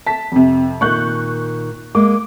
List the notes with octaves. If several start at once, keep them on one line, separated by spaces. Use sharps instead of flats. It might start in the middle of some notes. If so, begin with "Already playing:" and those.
A5 B6
F2 C3
A#2 D#3 C#6 F#6 G6
G#3 A#3 D6